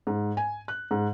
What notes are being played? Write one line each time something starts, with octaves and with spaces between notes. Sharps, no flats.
G#2
G#5
F#6
G#2